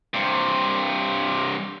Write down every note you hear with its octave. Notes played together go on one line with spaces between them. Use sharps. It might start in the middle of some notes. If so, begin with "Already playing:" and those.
G2 C3